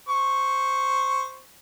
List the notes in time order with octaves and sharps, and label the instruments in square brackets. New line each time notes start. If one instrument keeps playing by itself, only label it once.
[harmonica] C5 C#6